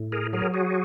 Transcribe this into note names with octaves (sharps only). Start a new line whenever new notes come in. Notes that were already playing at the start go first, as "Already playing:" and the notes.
Already playing: A2
G#4 A#4
F#3 G#4 A#4
F#4 G#4